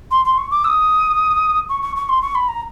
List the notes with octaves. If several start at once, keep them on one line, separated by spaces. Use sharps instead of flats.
C6
C6
C#6
D6
E6
D#6
C#6
C#6
C#6
C6
C#6
B5
A#5